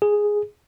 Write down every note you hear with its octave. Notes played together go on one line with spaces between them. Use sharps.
G#4